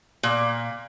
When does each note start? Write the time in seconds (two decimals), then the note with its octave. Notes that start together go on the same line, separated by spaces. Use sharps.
0.23 A#2